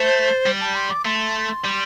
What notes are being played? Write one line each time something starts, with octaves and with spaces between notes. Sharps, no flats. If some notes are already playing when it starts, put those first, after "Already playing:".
Already playing: A3 C5
G3
A5
C6
D6
A3 C6
G3